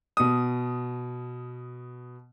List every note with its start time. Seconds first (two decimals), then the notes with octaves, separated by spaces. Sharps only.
0.17 B2 D#6